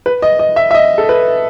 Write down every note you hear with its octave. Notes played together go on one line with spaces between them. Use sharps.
B4
D#5
D#5
E5
E5
D#5
A4
B4